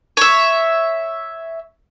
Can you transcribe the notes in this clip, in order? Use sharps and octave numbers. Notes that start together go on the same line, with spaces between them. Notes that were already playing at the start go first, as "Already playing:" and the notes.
C#5 E5